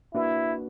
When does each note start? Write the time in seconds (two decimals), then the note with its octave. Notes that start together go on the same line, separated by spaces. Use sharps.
0.14 A#3 D4 E4 F#4 B4